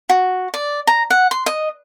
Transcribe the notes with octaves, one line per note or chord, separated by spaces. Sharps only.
F#4
D5
A#5
F#5
C6
D#5